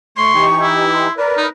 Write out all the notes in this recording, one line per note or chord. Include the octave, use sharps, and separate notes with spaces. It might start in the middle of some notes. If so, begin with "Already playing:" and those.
A3 C6 C#6
E3 D#4 G4
E4
C6
A#4 B4 D5
D#4